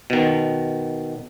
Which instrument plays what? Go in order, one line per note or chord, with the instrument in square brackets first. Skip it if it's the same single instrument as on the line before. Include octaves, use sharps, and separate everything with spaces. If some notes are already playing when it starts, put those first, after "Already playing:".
[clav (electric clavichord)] B2 D#3